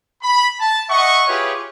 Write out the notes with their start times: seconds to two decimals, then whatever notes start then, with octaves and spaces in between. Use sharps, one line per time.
0.23 B5
0.60 A5
0.90 D#5 E5 F#5 C#6
1.28 E4 F4 G4 G#4 B4 C#5